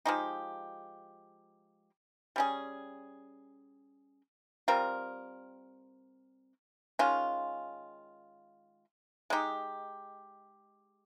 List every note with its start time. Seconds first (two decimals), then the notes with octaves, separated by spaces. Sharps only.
0.05 F3 G#3 D#4 G4
2.36 G3 C#4 G#4
4.68 G3 C4 F4 A#4
6.99 D#3 G#3 C#4 F4
9.30 G#3 D#4 G4